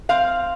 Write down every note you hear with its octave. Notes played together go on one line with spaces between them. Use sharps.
C4 F5